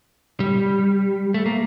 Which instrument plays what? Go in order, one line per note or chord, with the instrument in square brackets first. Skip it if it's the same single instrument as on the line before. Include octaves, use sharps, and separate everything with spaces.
[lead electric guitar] G3
A3
A#3